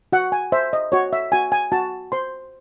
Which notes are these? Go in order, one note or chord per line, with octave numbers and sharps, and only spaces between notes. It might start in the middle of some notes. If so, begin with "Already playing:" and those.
F#4 F#5
G#5
C5 E5
D#5
F#4 C#5
E5
F#4 G#5
G#5
F#4 A5
C5 C6